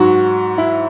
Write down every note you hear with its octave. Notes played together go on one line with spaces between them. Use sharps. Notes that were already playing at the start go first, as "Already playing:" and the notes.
Already playing: G#2 F#3 F#4
E4